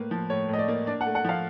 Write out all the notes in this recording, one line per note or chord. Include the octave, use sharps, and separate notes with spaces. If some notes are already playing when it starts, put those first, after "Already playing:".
Already playing: A2 A#3 B4
F3
A2 C#5
A2 D#5
D5
A#3
D4 D5
F#5
A3
F#5
F3 F5